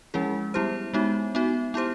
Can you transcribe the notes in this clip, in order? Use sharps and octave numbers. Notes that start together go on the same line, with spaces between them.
F3 G#3 C#4 E4 G#4
G3 B3 E4 G4 C5
G#3 B3 D#4 F#4
B3 D#4 F#4
B3 E4 G4 C5